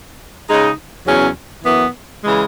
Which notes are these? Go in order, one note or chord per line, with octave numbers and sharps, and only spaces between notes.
C#3 G#3 D#4
E2 C#3 F#3 C#4
F#2 E3 B3
C#3 E3 G#3